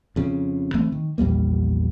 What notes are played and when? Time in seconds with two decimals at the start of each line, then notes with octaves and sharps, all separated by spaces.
0.16 F2 C#3
0.74 E3 A3 C4
0.92 D#3
1.18 A#1 E2 G3 A#3